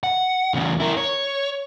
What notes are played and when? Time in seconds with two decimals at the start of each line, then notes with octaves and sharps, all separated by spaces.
0.03 F#5
0.54 E2 C#3
0.80 E4 A#4
0.97 C#5